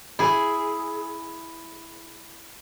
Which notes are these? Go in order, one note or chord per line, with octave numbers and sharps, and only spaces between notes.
E4 G#4